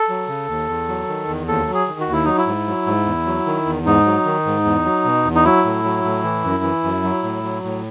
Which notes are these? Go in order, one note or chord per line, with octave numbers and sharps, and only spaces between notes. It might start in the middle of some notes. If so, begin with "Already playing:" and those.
Already playing: A4
F#3
C#3
D#2
E2
F#3
D#3
E2
D#2 A4
F#3
G#4
D#3
F#4
D#2
E4
F#3 D#4
E4
G#2
F#3
G#2
E2
F#3
D#3
E2
G#2 D#4
F#3
D#3
G#2
E2
F#3
B2
E2
D#4
F#3 E4
A2
F#3
A2
E3
F#2
E3
F#2
F#3
A2
F#3
A2